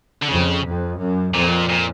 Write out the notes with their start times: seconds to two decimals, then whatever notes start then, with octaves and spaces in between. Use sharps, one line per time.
0.23 D3
0.29 F2 C#3
0.65 F2
1.00 F#2
1.34 F2 A#2
1.69 A#2